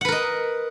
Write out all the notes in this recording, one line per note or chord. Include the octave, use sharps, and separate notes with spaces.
A#4 B4 D#5 F#5